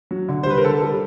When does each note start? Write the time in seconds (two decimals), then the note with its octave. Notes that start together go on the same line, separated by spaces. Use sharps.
0.11 F#3
0.29 D3
0.43 C5
0.46 G3 B4
0.57 A#4
0.64 D3 A4
0.82 G3